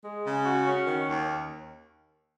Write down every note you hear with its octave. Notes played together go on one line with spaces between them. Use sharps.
G#3
C#3
F#4
C#4
D#3
D#2